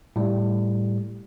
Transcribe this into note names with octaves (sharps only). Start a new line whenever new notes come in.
A2 G3